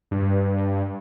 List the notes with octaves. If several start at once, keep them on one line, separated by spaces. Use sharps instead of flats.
G2